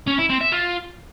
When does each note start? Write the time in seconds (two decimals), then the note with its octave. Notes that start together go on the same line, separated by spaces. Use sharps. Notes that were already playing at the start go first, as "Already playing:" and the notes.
0.07 C#4
0.18 E4
0.29 C4
0.41 E5
0.52 F4